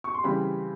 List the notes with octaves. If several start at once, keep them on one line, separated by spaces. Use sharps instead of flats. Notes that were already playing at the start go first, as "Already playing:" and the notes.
C#6
C6
C#3 E3 G3 C4 B5